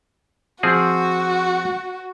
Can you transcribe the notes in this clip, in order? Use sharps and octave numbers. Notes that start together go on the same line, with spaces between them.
F3 C4 F#4 G#4